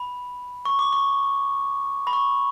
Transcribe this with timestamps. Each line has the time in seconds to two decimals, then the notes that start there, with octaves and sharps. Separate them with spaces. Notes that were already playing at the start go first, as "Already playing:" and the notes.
Already playing: B5
0.65 C#6
0.79 D6
0.92 C#6
2.07 B5
2.13 C#6